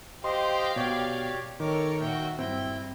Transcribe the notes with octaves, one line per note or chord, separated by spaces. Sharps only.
G4 C5 D#5 F5 G5 C6
B2 G4 C#5 D5
D#3 A4 A#4 C#5 D6
A#2 F#4 E5 G5
G2 C4 E4 G5